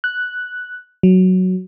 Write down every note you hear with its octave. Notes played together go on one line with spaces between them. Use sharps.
F#6
F#3